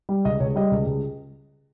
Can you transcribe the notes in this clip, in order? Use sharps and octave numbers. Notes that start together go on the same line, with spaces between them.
G3
C#2 D#5
C#2 C#5
G3 D#5
C#2
C#2